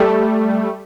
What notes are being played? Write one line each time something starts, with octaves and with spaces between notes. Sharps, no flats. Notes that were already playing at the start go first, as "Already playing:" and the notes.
Already playing: G3 A3